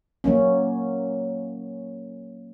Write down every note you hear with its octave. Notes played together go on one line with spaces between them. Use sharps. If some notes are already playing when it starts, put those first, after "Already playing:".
F#3 A#3 C#4